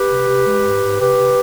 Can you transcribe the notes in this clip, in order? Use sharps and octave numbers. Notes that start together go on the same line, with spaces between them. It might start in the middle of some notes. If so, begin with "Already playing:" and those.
Already playing: G4 B4
C3
C3
G#3
G#2
G#2
C3 G4 B4
C3